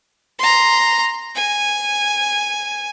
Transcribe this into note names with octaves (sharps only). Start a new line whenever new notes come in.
A#5 C6
G#5